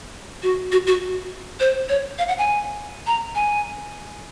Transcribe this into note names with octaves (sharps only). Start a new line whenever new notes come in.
F#4
F#4
F#4
C5
C#5
F5
F#5
G#5
A#5
G#5